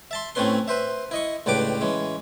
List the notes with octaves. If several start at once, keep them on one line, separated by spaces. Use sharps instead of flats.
E5 A5 C6
A2 A3 C4 C#4 B4 C6
B4 C5 E5
E4 D#5 C#6
C#2 A2 D4 G4 B4 D6
E3 G#3 C#4